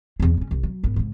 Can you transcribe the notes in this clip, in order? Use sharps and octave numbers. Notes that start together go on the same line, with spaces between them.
E2 C4
C#3 C#4
C2
F#3
G#1 B3
G#2 C#3